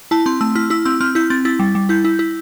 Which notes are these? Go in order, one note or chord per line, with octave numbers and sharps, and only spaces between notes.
E4 A5
C4 C6
A3 E6
E4 F6
E4 E6
C4 E6
C4 F6
E4 G6
C4 A6
E4 A6
G3
G3
E4 G6
E4
E4